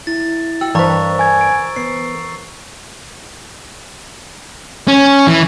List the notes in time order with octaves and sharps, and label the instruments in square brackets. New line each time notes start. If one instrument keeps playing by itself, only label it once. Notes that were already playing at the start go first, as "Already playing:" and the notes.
[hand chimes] E4 [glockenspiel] A6
[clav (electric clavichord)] F#4 [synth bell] G5 [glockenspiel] E6
[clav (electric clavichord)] G2 [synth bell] E3 C5 [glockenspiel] A#5 C#6 A6
[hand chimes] G#5 G#6
D7
[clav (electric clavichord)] B3 [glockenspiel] C7
[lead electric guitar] C#4
E3